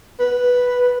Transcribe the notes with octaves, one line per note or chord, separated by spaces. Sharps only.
B4